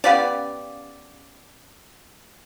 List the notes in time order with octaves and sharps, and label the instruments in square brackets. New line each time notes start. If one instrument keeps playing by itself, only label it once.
[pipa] B3 G4 D5 [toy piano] C#4 F5